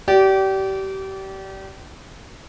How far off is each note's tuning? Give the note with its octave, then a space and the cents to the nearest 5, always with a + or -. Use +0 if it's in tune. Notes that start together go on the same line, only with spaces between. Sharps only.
G4 -30 D5 -20